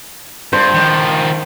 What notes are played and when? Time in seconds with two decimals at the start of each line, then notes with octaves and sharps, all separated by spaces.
0.53 G2 C5
0.74 D#3 F3